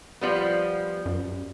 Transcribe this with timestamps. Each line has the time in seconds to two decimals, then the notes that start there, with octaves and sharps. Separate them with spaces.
0.21 F3 G3 B3
1.06 F#2